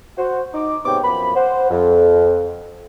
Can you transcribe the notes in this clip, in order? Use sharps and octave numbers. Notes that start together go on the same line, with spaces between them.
F#4 C5 F#5
D#4 D6
G#2 C3 B3 C#5 G5 D6
F#2 F3 B3 B5
C5 F#5
F2